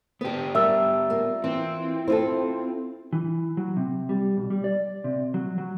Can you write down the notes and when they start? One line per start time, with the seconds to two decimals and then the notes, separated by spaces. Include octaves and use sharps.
0.21 B3 D4 G4 B4
0.55 G3 A#4 E5 E6
1.10 A#3 F4
1.44 E3 C4
2.08 E4 F4 A4 C5
3.13 E3
3.57 F#3
3.77 C3
4.09 G3
4.37 B1
4.50 G3
4.64 D5
5.04 C3
5.34 F#3
5.58 F#3